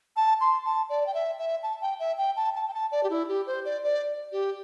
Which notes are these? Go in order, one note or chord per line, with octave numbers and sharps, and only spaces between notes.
A5
C6
A5
D5
G5
E5
E5
A5
G5
E5
G5
A5
A5
G5
A5
D5
G4
E4
G4
C5
D5
D5
G4